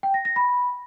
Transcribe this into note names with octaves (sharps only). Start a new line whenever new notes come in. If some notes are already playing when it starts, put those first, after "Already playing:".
G5
A#6
A#6
B5